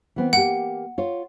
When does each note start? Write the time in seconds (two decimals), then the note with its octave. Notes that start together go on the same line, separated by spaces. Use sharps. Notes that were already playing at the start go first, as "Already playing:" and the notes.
0.16 E3 B3 C4
0.33 A#3 G4 F#5
0.98 F4 C#5